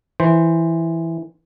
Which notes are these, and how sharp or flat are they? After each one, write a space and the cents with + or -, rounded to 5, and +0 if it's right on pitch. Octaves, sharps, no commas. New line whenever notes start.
E3 +0 C5 +0